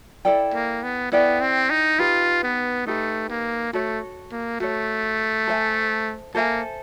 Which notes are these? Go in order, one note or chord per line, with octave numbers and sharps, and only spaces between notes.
E4 A4 D5 G5
A#3
B3
B3 E4 A4 D5 G5
C4
D#4
D#4 F4 G4 B4
B3
A3 D#4 G4 B4
A#3
A3 F#4 A4 C#5
A#3
A3 F#4 A4 C#5
A4 C5 E5 G#5
A#3 A4 C5 E5 G#5